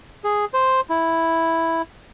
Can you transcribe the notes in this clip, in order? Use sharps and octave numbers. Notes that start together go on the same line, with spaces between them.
G#4
C5
E4